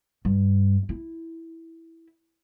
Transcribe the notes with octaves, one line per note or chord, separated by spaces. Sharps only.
G2
E4